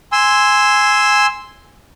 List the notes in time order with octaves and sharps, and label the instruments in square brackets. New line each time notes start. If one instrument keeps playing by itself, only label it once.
[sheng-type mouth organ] G#5 C6 E6